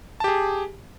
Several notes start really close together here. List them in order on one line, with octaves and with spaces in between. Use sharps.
A5 G4 G#4